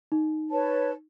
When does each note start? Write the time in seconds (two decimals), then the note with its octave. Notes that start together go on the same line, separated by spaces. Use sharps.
0.12 D#4
0.51 B4 C#5 A5